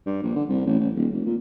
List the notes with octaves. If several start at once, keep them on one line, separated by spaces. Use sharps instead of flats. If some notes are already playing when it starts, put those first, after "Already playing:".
G2
A#1
D3
C2
A1
A1
D#1
F1
A#2